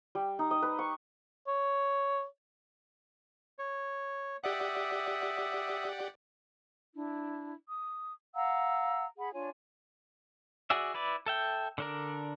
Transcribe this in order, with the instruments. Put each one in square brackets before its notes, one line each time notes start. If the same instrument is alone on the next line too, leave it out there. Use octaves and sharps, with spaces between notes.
[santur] G3
D#4
D#5
B4
C#6
[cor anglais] C#5
[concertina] C#5
[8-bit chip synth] G4 D5 F#5 [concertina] E5 D#6
[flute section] D4 E4
D#6
F5 F#5 A#5 E6
G#4 F#5 B5
D4 F4 C#5 G#5
[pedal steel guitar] F#4 G#4 D5 E5
E4 B4 D5
A4 E5 G5
D3 D4 A#4